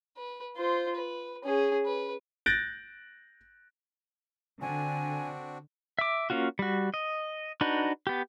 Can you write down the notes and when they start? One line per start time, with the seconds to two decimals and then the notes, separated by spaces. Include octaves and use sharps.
0.17 B4
0.57 F4 C5
0.95 B4
1.44 C#4 G#4
1.86 B4
2.46 F#6 G6 A6 A#6 D7
4.61 D3 C4 D4 F#4 G#5
5.99 E5 D6
6.30 A#3 C#4 F4 F#4
6.59 G3 F#4
6.94 D#5
7.61 D4 D#4 F#4 B4
8.07 B3 G4